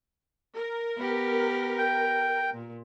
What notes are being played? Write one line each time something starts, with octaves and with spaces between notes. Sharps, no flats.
A#4
B3 G4
G5
A#2